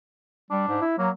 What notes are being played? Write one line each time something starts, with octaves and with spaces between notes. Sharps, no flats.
G3 D4
G#2
E4
F#3 A#3